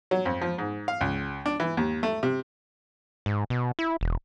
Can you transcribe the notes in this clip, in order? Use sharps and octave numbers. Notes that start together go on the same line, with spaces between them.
F#3
F2
F3
G#2
F5
C#2
D4
E3
D#2
A3
C3
G#2
B2
E4
E1